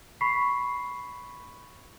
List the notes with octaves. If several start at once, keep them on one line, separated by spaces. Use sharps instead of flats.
B5 C#6 B6 C7